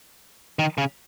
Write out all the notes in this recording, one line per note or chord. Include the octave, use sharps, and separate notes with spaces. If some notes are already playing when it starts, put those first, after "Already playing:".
D#3
C#3